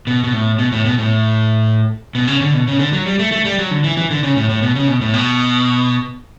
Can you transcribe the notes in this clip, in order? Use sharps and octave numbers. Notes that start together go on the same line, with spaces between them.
B2
B2
A2
B2
A2
B2
A2
B2
C#3
D3
B2
C#3
D3
F#3
G3
A3
A3
G3
F#3
D3
E3
E3
D3
C#3
A2
A2
B2
C#3
B2
A2
B2